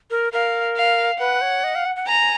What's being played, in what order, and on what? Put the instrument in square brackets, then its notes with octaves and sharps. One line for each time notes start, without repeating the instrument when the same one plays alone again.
[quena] A#4
[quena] A#4 [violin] F5
[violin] F5
[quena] B4 [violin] F#5
[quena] C#5
D#5
F5
F#5
F#5
[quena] G#5 [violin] A#5